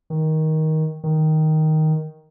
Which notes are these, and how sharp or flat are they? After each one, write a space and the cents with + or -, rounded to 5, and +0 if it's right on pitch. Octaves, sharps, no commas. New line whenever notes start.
D#3 +15
D#3 +5